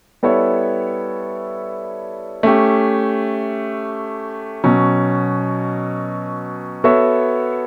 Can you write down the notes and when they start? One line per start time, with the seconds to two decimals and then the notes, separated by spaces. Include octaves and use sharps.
0.23 G3 B3 E4 A4 C#5
2.43 A3 C#4 G4
4.64 B2 F#3 C#4
6.84 B3 F#4 A4 C#5 E5